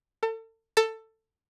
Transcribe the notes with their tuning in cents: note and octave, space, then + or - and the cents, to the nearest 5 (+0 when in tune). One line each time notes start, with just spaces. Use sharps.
A4 +35
A4 +15